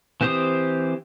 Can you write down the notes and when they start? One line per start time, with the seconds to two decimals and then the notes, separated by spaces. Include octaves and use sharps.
0.21 E3 C4 G4 C5 D#6